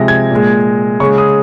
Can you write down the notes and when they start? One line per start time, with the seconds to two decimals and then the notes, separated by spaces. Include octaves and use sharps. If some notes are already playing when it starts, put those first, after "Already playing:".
Already playing: C3 F3 G#3 A#6
0.08 G#6
0.31 A#2 G#3
1.00 C#3 G#3 C#6
1.18 D#6